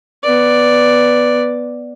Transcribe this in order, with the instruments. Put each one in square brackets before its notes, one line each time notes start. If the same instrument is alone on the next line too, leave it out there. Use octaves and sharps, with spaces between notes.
[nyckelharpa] B3 D5